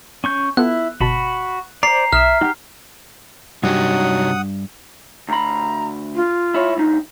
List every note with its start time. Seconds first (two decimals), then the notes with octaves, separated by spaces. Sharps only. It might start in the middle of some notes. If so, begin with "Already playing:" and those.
0.24 C#4 C#6 G6
0.57 B3 E4 F4 A4 F#6
1.01 G1 B2 F#4 A5 B5
1.83 C5 D5 A#5 C7
2.13 B1 E5 D#6 F6 E7
2.41 G#3 D#4 G4 F#5
3.63 G2 C3 F#3 D#4 G4 F#5 D#6
5.29 D2 A#5 B5
6.15 F4
6.54 E4 C#5
6.77 D2 D#4